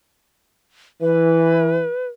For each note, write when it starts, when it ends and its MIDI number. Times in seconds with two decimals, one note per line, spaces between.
1.02 1.84 52
1.02 2.07 71